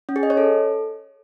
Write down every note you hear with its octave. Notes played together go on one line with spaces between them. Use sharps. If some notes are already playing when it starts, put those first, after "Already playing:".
C#4
G#4
D#5
C#5
A4